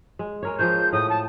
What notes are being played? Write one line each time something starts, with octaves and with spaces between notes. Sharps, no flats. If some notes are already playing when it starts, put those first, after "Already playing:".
G#3
G#3 A#4 C#5
F3 G#4 C#5 G6
A2 D#6
A5